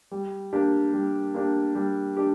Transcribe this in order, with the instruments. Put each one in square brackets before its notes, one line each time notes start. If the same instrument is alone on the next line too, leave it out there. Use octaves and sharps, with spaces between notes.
[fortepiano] G3
A#3 D4 G4
G3
A#3 D4 G4
G3
D4 G4